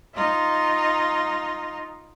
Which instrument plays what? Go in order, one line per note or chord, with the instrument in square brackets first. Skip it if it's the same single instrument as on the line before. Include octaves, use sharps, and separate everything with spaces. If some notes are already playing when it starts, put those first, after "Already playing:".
[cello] D#4 F4